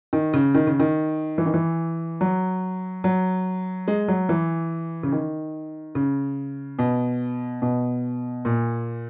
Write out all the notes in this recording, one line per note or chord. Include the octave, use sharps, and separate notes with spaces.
D#3
C#3
D#3
C#3
D#3
E3
D#3
E3
F#3
F#3
G#3
F#3
E3
C#3
D#3
C#3
B2
B2
A#2